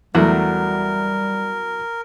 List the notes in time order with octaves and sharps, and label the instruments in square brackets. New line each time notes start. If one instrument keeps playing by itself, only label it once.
[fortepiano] E2 A3 [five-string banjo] F#3 F#4 [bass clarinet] G3 [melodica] A#4